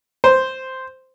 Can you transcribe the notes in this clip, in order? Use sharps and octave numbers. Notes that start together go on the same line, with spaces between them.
C5